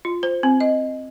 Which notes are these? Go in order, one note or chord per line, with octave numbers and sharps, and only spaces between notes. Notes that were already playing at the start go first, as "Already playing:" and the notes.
F4
C5
C4
D#5